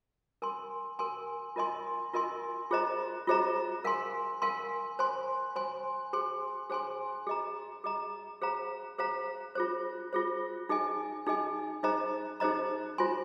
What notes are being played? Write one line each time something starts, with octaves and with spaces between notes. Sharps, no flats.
A#4 G#5 C6
A#4 G#5 C6
F4 A#4 D#5 G#5 C6
F4 A#4 D#5 G#5 C6
F4 G#4 C5 D#5 A#5
F4 G#4 C5 D#5 A#5
A#4 F5 G#5 C6
A#4 F5 G#5 C6
C5 G#5 C6
C5 G#5 C6
G#4 C5 G#5 C6
G#4 C5 G#5 C6
G#4 D#5 A#5
G#4 D#5 A#5
G#4 C5 F5 A#5
G#4 C5 F5 A#5
F4 G#4 C5
F4 G#4 C5
D#4 G#4 D#5 G#5
D#4 G#4 D#5 G#5
D#4 G#4 C5 D#5 A#5
D#4 G#4 C5 D#5 A#5
F4 C5 G#5 C6